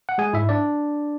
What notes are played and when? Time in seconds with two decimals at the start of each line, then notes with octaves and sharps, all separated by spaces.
0.09 F#5
0.18 G#3 G#4 G#5
0.33 G#2 E4 E5
0.49 D4 D5